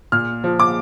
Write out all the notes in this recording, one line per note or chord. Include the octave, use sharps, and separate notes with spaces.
A#2 F6
F3
D6